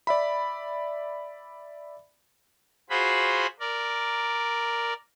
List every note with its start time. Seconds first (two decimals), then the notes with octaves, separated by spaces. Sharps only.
0.07 D5 E5 B5
2.90 F4 F#4 G#4 C5 B5
3.60 A#4 D5